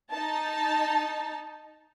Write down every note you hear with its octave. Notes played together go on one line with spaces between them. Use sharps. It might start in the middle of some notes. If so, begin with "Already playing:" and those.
D#4 A5